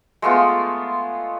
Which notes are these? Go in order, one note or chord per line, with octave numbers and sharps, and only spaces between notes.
G#3 A3 B3 F4